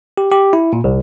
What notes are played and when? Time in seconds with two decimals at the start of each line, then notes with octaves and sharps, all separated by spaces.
0.18 G4
0.32 G4
0.53 E4
0.73 A#2
0.84 C2